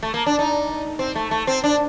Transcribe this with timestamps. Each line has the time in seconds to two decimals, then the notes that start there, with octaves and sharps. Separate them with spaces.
0.03 A3
0.14 A#3
0.26 D4
0.39 D#4
0.99 C4
1.15 A3
1.31 A3
1.47 C4
1.64 D4